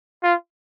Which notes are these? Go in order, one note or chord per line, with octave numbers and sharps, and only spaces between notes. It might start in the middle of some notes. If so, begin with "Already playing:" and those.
F4